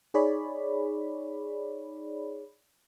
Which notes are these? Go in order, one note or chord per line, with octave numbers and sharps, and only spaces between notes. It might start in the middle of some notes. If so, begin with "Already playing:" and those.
D#4 G#4 C#5 D5 B5